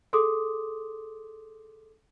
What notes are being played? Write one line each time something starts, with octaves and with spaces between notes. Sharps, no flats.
G#4 A4 C6 D6 D#6